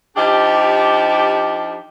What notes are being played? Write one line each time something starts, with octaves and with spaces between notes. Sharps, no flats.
F3 D4 D#4 G4